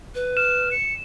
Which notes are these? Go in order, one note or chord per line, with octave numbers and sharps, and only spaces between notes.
B4
F6 E7
C#7